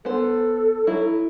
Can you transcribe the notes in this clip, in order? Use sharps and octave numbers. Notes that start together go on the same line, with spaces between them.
B3 A4 C5
F#3 E4